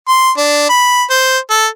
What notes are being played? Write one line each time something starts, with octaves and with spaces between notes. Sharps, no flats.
C6
D4
B5
C5
A4